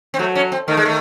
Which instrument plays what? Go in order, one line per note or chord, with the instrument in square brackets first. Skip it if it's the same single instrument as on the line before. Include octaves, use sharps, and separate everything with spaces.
[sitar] C4
[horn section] F#3 [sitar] A3
[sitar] C#4
C4
[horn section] D#3 [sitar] A3
[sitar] G#3
A3